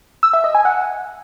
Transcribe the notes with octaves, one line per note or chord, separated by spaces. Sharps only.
E6
E5
D#5
G#5
F#5